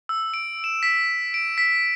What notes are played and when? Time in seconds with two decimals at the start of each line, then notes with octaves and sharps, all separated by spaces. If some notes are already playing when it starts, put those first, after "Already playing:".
0.09 E6
0.34 D7
0.64 E7
0.83 B6
1.34 D7
1.58 B6